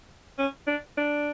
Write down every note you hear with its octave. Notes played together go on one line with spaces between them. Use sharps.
C#4
D4
D4